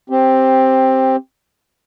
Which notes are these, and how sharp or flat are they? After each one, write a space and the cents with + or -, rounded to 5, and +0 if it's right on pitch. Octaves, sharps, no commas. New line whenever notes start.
C4 +10 G4 +0